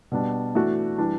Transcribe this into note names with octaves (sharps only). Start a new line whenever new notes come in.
B2 G3 D4
E3 A3 D4 F#4
E3 G3 D4